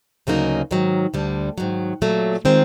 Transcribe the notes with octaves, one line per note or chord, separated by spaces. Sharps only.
D2 C#3 F#3 A#3 D#4
G#2 D#3 F#3
D2 D3 G3
G#2 D#3 F#3
A#2 F#3 A3
D#3 G#3 C4 F4